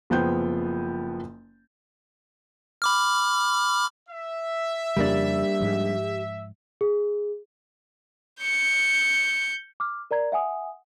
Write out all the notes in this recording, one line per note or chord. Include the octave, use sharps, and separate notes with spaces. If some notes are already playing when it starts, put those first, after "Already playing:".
F#1 F3 B3 G5 G6
B5 D6 F6
E5
F2 C#3 G3 A#3 D4 G4
G#2 F3
G#4
G6 C#7
D6 F6
A#4 D5 A#5 G#6
E5 F#5 G#5 D#6